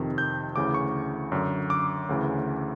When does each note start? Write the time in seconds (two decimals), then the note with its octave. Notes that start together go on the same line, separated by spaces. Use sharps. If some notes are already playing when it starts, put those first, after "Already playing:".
Already playing: F2 C3 D#3
0.18 G6
0.56 D2 C#3 E3 D6
0.74 C#6
1.32 F#2 D3
1.70 D6
2.09 D2 C#3 E3